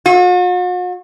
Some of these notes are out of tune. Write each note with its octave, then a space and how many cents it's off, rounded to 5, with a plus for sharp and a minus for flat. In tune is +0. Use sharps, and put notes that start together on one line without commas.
F#4 -45